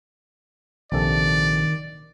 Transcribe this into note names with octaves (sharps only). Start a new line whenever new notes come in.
A#1 C3 D#3 A4 D5